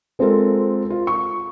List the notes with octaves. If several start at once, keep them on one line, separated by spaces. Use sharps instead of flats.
G#3 C4 F4 A4 A#4
F4
C#6